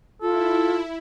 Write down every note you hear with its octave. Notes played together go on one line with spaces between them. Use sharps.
E4 F4 A4